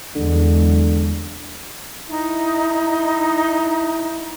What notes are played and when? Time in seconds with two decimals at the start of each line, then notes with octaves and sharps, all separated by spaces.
0.16 E2 D3 F#3 G#3
2.09 D#4 E4